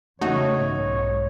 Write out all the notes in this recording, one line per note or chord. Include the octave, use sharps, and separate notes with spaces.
E2 C#3 A3 D#4 F#4 C#5
B1 G#2 C#5